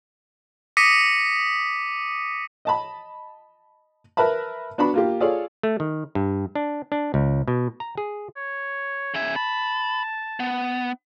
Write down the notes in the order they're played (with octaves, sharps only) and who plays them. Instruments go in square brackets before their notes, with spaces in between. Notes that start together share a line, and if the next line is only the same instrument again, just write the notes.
[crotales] D6 D#6 A#6 B6 C#7 D#7
[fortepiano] D#5 A5 B5
A#4 B4 E5 A5 B5
B3 D4 F#4 B5
A#3 F4 G4
F4 G#4 A4 C#5 D5 F5
[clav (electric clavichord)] A3
D#3
G2
D4
D4
C#2
B2
A#5
G#4
[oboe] C#5
[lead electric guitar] C#3 E5 [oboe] G#5
[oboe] A5 [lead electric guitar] B5
[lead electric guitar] B3